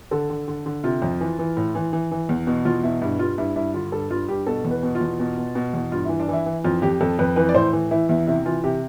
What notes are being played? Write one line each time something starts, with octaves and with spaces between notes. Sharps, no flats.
D3 A4
D3
D3
D3
C3 F4
F2
E3
E3
A2
E3
E3
E3
E2
B2
E2 F4
B2 E4
G2 E4
G2 F4
G2 E4
G2 E4
D3 F4
G2 A4
G2 F4
G2 G4
B2 A4
E2
B4
B2
F4
E2
B2
B2
B2
E2
G2 F4
E3 E4
D4
E3 E4
E3
F2 F4
F2 G4
F2 A4
F2 B4
E3 B4
D5
A2 C5
E3
E3 E4
E2 E4
C3 E4
E3 F4
C3 G4